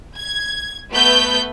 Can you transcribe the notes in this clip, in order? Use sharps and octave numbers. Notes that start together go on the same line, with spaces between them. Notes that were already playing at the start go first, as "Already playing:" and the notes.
G#6
A3 B3 B4 G6